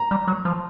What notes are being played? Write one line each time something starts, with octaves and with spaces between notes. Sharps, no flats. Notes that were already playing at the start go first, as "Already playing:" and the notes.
Already playing: A#5
G3
F#3
F3